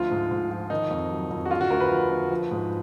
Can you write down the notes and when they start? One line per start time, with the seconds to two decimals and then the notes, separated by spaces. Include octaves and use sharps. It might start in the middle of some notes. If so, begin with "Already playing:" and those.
Already playing: D2 F3 F4
0.11 G#2
0.31 G#2
0.51 F3
0.70 D#3 D#4
0.91 F2
1.11 F#3
1.31 F2
1.45 F#4
1.51 D3 F4
1.61 F#4
1.70 D2 A#4
1.80 B4
1.91 F3
2.10 D2
2.31 F3
2.51 G#2